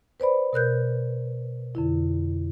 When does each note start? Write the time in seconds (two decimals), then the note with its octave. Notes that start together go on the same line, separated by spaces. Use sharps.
0.20 B4 C5 D5 B5
0.53 B2 A#4 F#6 G6
1.75 F2 D3 E4